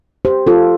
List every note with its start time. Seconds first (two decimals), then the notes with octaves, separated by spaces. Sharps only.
0.25 G4 C5
0.47 F4 A4